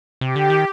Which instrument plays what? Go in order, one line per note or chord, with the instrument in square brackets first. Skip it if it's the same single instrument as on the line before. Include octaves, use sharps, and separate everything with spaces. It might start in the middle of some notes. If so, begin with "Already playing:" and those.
[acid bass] C3 [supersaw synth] G4
[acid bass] D3
D#3